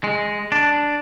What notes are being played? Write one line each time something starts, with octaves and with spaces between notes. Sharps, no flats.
G#3
D4